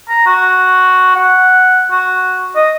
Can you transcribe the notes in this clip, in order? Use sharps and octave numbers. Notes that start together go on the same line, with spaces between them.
A#5
F#4
F#5
F#4
D#5